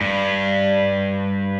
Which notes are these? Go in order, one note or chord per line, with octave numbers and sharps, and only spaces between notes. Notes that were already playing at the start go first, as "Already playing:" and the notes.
G2